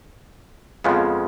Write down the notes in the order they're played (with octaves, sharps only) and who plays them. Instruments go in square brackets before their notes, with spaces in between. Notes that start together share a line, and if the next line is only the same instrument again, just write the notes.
[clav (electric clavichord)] F2 C#3 F3 G#3 B3